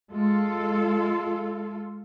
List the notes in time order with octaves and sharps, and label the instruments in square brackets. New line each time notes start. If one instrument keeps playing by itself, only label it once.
[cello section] G#3 F4 A4